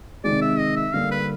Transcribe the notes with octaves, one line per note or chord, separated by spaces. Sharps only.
C3 D#3 G#3 D5
E5
D#5
E5
D3 G3 A#3 F5
B4